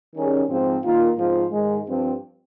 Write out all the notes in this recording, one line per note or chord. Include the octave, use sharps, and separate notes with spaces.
D#3 G3 C#4 G#4
G#2 F3 C4
D#3 A#3 F4
G#2 F3 C4 F4
G#2 D#3 G#3
G2 F3 C4